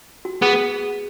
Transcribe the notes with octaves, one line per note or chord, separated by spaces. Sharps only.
F#4
B3 G#4